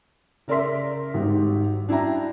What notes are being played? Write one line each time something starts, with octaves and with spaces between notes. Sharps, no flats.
C#3 A#4 D5 E5 C6 B6
G#1 G#2 G3 F#4
D4 E4 F#4 G5 A#5